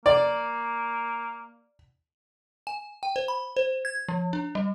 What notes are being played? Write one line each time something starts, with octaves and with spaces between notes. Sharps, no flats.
A#3 D5
G#5
G5
C5
B5
C5
G#6
F3
D4
G3